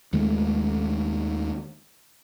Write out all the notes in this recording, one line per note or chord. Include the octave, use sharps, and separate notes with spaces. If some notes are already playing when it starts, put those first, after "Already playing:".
D#2 D#3 G#3 A3